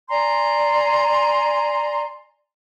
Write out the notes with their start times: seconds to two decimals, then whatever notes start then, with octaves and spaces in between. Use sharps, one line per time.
0.10 D5 G#5 A#5 C6